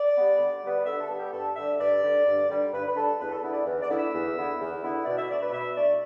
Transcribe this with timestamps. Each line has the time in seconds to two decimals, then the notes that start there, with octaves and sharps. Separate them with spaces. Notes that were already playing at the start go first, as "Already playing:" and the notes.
Already playing: D5
0.16 G3 B3
0.38 D3
0.61 G3 B3
0.85 D3 E5
1.01 A4
1.09 G3 B3
1.17 G4
1.32 G2 A4
1.55 D3 G3 E5
1.79 G2 D5
2.02 D3 G3
2.25 G2
2.48 D3 G3
2.72 G2 B4
2.87 B4
2.95 D3 G3 A4
3.19 E2 B4
3.30 A4
3.42 D3 B3 E4 B4
3.53 D5
3.65 E2
3.81 D5
3.89 D3 B3 E4
3.97 E5
4.13 E2
4.35 D3 B3 E4
4.60 E2
4.83 D3 B3 E4
5.05 B2 D5
5.17 E5
5.29 A3 D4 D5
5.41 B4
5.52 B2 E5
5.76 A3 D4 D5